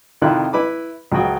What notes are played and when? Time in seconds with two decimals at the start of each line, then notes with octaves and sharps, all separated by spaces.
0.22 F2 C3 D#3 E4 F4 F#6
0.53 E4 B4 B5 D6
1.12 C#2 F3 F#3 F#4 G5 D#6